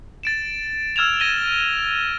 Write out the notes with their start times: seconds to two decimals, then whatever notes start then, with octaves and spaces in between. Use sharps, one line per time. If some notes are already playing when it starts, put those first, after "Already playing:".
0.23 A6 D7 E7
0.96 E6 F6 G#6 E7 F7
1.20 G#6 A#6 D#7 G7